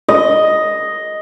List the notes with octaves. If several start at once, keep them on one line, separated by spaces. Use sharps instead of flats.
D#5